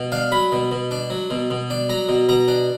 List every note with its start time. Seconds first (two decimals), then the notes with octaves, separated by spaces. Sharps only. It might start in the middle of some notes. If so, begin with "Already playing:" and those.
Already playing: B2
0.12 D4 F5
0.32 F#3 B5
0.52 B2
0.71 B2
0.91 D4
1.10 F#3
1.30 B2
1.50 B2
1.70 D4
1.89 F#3 A#5
2.08 B2
2.29 B2 A#5
2.48 D4